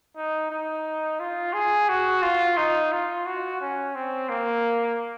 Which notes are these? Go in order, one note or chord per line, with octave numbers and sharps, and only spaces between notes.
D#4
D#4
F4
G#4
F#4
F4
D#4
F4
F#4
C#4
C4
A#3